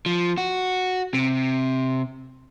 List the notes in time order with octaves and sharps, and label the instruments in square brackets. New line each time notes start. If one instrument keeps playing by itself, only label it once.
[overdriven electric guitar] F3
F#4
C3